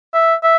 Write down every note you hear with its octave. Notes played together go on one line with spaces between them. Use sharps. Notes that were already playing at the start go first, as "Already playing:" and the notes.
E5
E5